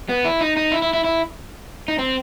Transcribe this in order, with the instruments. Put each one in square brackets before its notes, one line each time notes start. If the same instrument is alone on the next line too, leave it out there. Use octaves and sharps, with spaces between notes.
[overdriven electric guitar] B3
E4
D#4
D#4
E4
E4
E4
E4
D#4
C4